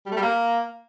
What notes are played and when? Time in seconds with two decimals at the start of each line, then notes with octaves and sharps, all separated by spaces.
0.06 G3
0.11 A3
0.17 G3
0.22 A#3